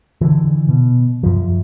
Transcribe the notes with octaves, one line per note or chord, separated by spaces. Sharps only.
D3 E3
B2
F#2 F3